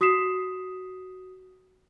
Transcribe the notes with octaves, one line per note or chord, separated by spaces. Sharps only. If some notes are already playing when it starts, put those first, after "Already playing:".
F#4 D#6 B6 C7 E7